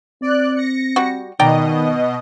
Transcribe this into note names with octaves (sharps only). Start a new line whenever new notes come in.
C4 D5 F#6
A#6 C#7
G3 F#4
B2 D#3 D5 D#5 G5 A#5